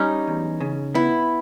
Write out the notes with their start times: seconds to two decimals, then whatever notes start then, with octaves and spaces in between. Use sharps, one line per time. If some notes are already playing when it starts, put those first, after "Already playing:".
Already playing: G3 C#4 D#4
0.27 E2
0.60 C#3
0.95 B3 E4